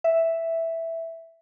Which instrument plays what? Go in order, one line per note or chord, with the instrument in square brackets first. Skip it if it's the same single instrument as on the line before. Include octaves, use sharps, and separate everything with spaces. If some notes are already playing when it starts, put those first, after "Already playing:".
[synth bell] E5